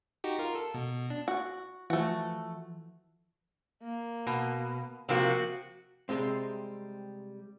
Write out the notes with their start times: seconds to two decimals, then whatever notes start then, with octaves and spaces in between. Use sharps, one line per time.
0.24 D#4 F#4 G4
0.39 F4 A#4
0.55 A4
0.74 B2
1.10 D4
1.28 F#4
1.90 E3 F3 A3 F#4
3.83 A#3
4.27 B2
5.09 C3 F3 A#3 F#4
6.09 C3 F3 G3 G#3 C4